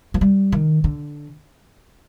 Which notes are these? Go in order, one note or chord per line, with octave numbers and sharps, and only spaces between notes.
F3
G3
D#3
D3